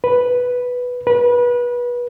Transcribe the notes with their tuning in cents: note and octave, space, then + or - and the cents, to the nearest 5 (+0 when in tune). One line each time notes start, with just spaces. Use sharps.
B4 +0
B4 -25